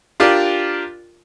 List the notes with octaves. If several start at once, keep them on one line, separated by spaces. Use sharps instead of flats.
D4 F4 G4 A#4 D5